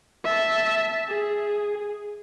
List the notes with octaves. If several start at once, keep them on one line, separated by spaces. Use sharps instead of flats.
E5 A5
G#4